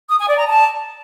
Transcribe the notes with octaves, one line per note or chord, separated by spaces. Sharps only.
D#6
G#5
D5
A#5
A5